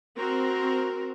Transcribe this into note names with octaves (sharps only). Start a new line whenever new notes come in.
C4 F#4 A#4